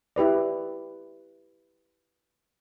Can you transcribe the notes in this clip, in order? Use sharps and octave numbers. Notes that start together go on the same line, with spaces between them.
E4 G4 B4 D5